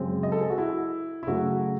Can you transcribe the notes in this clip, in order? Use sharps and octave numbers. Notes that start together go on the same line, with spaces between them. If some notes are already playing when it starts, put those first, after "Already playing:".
Already playing: F#2 C#3 G#3 C4
D#5
A4
G#4
F#4
E4
E4
C#3 F#3 A3 F#4